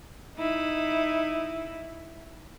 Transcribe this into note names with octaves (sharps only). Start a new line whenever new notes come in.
D#4 E4